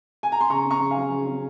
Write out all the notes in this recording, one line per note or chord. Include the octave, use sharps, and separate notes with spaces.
G#5
A#5
C6
C#3 A#5 C#6
C#4
A#5 C#6
C#3
F5 G#5
F#3
C#3
C#4